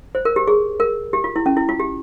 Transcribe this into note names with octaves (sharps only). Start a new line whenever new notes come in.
C5
A#4
G4
G#4
A#4
G4
F4
E4
C#4
E4
F4
G4